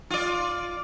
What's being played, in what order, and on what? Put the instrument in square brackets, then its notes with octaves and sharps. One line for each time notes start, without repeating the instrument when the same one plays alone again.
[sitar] F4 D5